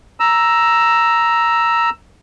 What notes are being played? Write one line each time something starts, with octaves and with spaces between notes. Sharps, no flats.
A#5 E6